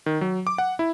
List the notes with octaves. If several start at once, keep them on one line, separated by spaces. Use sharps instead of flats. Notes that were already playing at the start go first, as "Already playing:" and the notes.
D#3
F#3
D6
F#5
E4